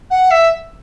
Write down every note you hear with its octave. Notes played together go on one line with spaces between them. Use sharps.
F#5
E5